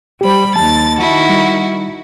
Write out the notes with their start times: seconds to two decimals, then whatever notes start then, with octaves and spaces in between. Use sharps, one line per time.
0.21 G3 G4 C5 B5
0.56 D#2 A5 A6
0.99 D#3 E4 F#4
1.29 G3